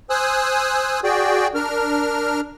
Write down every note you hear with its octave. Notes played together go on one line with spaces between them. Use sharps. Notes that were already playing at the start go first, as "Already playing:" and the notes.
C5 G#5 D#6 E6 F#6
F#4 G#4 D5 G5
D4 A#4 F6